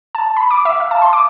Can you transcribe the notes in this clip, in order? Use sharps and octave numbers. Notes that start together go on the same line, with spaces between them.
A5
B5
D6
E5
F5
A5
C6
D6